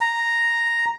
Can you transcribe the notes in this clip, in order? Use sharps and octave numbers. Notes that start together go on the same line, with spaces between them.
A#5